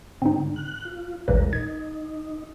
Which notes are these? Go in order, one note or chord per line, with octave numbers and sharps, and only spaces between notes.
G#2 D3 C4 D#4
F#6
F4
A1 D#2 A#2 G#3 A#4 B4
D#4 G#6